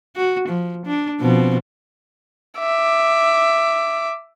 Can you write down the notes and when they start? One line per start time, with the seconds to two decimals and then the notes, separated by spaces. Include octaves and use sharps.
0.16 F#4
0.48 F3
0.86 D4
1.20 B2 F3 C4
2.59 E5 D6